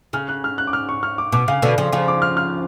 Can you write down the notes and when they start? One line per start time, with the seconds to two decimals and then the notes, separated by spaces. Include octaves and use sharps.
0.13 C#3 F6
0.29 F#6
0.44 F6
0.58 F#6
0.67 D6
0.73 F6
0.89 C#6
1.03 F6
1.18 D6
1.32 B2 D6
1.48 C#3 F5
1.62 B2 D3 D5
1.78 C#3 F3
1.92 C#3 F3 F5
2.08 D6
2.22 F6
2.37 F6